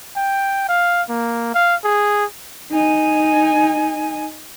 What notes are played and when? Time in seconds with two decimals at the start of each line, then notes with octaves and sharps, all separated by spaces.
0.16 G5
0.69 F5
1.09 A#3
1.54 F5
1.84 G#4
2.72 D#4 G#5